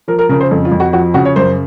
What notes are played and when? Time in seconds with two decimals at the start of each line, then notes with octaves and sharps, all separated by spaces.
0.08 F3 A#4
0.19 A#4
0.29 C#3 A#4
0.40 C5
0.51 F2 A4
0.65 F4
0.72 F2
0.80 F#4
0.93 F3 F#4
1.14 C#3 F#4
1.25 C#5
1.36 F#2 C5